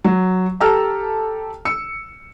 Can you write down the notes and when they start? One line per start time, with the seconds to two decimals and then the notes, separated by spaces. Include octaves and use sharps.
0.04 F#3
0.60 G4 A4 A5 A#5 E6 F6
1.65 E6 C#7